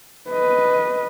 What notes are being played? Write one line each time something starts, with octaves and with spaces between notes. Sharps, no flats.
B4 D#5